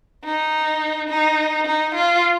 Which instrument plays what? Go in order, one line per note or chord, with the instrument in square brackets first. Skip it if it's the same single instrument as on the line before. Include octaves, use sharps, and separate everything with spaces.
[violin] D#4
D#4
D#4
F4